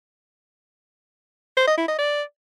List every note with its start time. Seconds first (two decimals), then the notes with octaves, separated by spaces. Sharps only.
1.57 C5
1.68 D#5
1.78 E4
1.88 D#5
1.99 D5